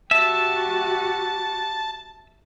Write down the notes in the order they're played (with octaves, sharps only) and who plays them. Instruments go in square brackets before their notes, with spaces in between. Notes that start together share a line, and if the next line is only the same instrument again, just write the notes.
[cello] F#4 G4 [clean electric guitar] E5 [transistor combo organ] A5